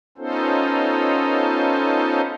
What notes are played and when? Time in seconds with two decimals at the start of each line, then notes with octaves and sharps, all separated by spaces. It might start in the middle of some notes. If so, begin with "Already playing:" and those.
0.18 B3 C#4 D#4 F4 A4 C5